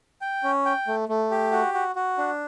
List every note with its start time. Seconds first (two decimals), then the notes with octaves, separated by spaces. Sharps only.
0.21 G5
0.43 C#4
0.65 G5
0.87 A3
1.09 A3
1.31 G4
1.52 F#4
1.74 F#4
1.96 F#4
2.18 D4